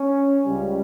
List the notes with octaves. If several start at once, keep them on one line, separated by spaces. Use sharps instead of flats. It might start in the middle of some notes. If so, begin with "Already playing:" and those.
Already playing: C#4
C#2 C#3 G3